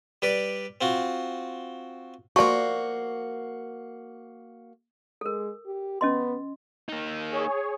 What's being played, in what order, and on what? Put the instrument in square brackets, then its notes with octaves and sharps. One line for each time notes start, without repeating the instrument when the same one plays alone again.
[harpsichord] G3 B4 D5
C4 F4 F#4
[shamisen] F3 D5 [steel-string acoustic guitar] A#3 F#4 [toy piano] C#6
[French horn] G#3 [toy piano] A4 A#4
[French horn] G4
[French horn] B3 [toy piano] C#4 D#5 C6
[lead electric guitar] A#3 D#4
[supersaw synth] G#4 C#5